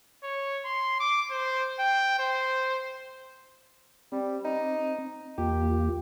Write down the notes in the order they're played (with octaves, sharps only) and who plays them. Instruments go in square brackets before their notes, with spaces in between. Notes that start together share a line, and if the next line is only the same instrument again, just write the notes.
[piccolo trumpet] C#5
C6
D6
C5
G5
C5
[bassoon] G3 [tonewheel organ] C4
[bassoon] D#4
[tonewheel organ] E2 A#3 F4 [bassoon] G4